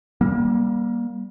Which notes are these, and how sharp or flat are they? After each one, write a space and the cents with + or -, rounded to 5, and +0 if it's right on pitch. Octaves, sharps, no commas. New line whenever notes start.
G3 +0 A#3 +30